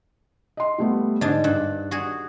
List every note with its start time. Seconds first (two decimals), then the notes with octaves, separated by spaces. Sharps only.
0.57 D#5 C6
0.78 G3 A3 B3
1.21 G#2 D3 D4
1.44 G2 F#6
1.91 F#4 G#4